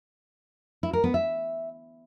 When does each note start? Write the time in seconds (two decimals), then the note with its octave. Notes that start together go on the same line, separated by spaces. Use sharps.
0.83 E4
0.93 A#4
1.04 B3
1.14 E5